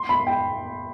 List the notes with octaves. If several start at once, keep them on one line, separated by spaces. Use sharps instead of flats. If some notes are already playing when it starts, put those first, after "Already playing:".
Already playing: C6
B5
G5